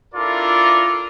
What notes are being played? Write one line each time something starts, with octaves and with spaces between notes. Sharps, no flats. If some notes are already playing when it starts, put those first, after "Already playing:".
D4 E4 F4 A4 A#4 D5